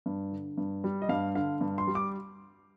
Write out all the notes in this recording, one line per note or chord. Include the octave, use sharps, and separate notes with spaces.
G2
D3
G2
G3
D#5
G2 F5
D3 F5
G2
C6
G3
D6